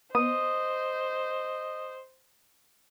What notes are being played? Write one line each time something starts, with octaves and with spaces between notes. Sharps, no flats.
B3 C5 D#5 D#6